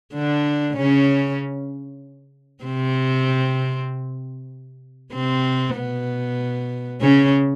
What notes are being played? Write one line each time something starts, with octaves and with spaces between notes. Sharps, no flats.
D3 D4
C#3 C#4
C3 C4
C3 C4
B2 B3
C#3 C#4